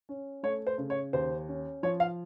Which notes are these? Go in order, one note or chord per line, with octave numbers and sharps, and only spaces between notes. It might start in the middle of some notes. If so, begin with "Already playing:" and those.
C#4
A3 C#5
C5
C#3
C#5
D#2 C5
C#4
F3 C#5
F5